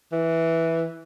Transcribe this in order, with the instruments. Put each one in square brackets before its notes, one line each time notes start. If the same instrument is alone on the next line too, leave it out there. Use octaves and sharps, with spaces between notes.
[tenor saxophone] E3